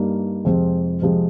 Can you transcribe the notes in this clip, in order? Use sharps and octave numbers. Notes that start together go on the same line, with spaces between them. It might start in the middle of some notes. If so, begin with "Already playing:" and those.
Already playing: G2 G3 A#3 D#4
F2 C3 F3 G#3 C4
F2 C3 F3 G#3 C4